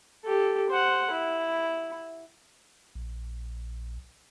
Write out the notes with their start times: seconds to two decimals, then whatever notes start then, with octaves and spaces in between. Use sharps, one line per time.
0.24 G4 A4
0.70 C5 F#5
1.11 E4
2.95 A#1